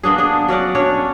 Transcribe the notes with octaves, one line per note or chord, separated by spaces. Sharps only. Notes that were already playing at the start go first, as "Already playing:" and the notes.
A#3 B3 D4 G#4
D4 G#4
F#3 C#4 D5 F#5
C#4 D4 C#5